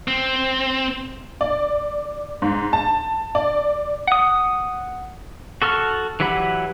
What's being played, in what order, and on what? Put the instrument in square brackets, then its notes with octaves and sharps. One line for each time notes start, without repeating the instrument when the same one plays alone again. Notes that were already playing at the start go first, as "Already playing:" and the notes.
[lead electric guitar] C4
[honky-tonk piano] D5
G#2
A5
D5
[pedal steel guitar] F#5 D#6
F#4 A4 C#6 F6
E3 F#3 G4 F#5 B5